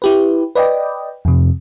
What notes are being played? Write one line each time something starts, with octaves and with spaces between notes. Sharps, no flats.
E4 G4 B4
B4 D5 D#5 G5
F2 C3